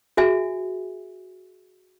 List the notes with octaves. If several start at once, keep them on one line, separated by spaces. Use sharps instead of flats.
F#4 G#4 E5 G#5